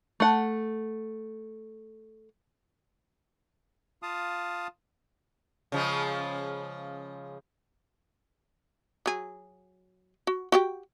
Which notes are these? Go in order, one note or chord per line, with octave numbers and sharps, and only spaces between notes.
A3 F#5
F4 F5 A5 D#6
C#3 F3 G#3
F#3 G#4
F#4
F#4 G4 G5